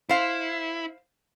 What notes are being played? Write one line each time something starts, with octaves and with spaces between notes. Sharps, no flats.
E4 C5 F5